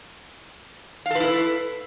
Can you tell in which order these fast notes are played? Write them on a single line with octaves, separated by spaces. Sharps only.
F5 A4 B4 E4